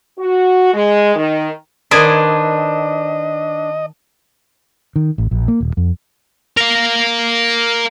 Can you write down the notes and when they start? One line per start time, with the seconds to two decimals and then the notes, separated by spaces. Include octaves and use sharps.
0.18 F#4
0.73 G#3
1.16 D#3
1.91 D#3 D4 B4 C5 D#5 D#6 G#6
4.96 D#3
5.18 A1
5.31 A#1
5.48 A#3
5.60 D#1
5.77 F2
6.57 A#4 F5